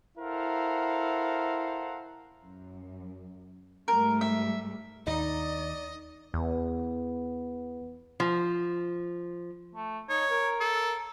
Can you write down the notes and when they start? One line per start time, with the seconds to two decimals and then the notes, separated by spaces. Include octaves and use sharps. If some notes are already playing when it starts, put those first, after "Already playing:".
0.18 E4 A4 A#4 C5 F5 F#5
2.44 F#2
3.88 G#2 G3 A3 A#4
4.21 E5
5.07 D#2 D#4 D5 D#5
6.34 E2 B3
8.20 F3
9.75 A3
10.09 D#4 C#5
10.30 A#4
10.60 A4